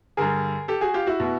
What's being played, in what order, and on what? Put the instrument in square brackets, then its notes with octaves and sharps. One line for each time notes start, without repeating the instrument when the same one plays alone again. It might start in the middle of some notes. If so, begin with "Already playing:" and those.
[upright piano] G2 D3 G#4 A#4
G4 A4
F#4 G#4
F4 G4
E4 F#4
B2